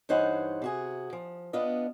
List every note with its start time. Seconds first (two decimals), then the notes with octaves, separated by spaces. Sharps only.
0.09 G2 E3 D#4 C5 C#5 F#5
0.62 C3 F#4 G#4
1.13 F3
1.53 B3 D4 F4 D#5